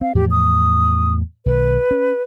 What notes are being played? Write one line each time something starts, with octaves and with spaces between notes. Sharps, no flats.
C4 F5
E2 A2 F3 G4
D#6
B1 D#3 B4
C#4